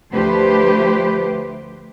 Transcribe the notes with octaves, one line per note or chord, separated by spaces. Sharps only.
D2 F3 A3 G4 B4 C5